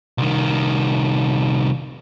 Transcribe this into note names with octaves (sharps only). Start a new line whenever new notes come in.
C2 D#3